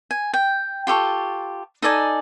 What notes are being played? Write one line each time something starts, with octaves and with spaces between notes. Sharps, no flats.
G#5
G5
F4 G4 A4 C#6
D#4 A4 D5 G#5